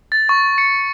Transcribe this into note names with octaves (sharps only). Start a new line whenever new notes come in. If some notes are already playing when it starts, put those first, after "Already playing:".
A6
C#6
C#7